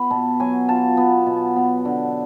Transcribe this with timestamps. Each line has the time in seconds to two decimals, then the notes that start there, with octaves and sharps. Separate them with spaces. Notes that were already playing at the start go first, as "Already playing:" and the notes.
Already playing: B3 B5
0.11 B2 A5
0.40 F#3 G#5
0.69 F4 A5
0.97 B3
1.26 B2
1.56 B3
1.85 D3